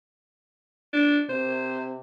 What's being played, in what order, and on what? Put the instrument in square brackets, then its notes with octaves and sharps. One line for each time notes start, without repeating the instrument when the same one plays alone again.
[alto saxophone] D4
[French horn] C3 [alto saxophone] C5